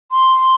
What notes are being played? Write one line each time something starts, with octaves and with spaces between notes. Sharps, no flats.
C6